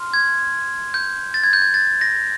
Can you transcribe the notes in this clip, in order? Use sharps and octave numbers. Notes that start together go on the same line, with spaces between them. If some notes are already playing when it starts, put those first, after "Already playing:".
Already playing: C6 F6
G#6
G6
A6
G#6
G6
G#6
A6
A#6